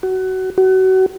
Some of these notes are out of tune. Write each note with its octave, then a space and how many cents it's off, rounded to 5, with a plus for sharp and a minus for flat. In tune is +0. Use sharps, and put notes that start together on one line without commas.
F#4 +20
F#4 +30